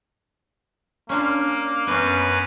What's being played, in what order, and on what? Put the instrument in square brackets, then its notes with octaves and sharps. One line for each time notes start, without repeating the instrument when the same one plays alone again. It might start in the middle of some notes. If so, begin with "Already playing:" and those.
[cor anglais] A#3 [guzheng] C#4 D4 F4
[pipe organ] F#2 B4 [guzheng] B3 C#4